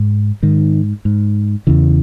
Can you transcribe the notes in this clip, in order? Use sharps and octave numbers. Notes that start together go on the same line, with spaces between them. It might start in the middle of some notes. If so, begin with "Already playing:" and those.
Already playing: G#2
G#2 D#3
G#2
E2 C#3 E3